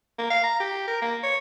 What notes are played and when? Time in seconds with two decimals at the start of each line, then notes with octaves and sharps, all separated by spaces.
0.19 A#3
0.30 F5
0.43 A#5
0.60 G4
0.88 A#4
1.02 A#3
1.23 C#5